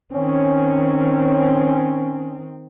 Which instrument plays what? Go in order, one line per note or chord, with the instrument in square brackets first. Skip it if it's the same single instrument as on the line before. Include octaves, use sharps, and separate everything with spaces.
[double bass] D#3 C4 [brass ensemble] C#4